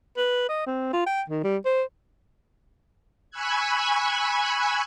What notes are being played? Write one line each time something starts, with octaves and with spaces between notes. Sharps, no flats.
B4
D#5
C4
F4
G5
D#3
G3
C5
G#5 B5 C#6 E6 F#6 G#6